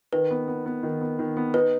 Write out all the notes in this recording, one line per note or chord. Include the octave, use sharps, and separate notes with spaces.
D#3 B4
B3
B3
B3
D#3
B3
D#3
B3
D#4 B4